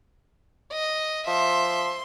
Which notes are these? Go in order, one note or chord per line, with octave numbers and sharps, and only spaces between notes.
D#5
F3 E5 C6